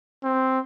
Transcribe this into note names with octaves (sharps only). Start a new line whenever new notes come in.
C4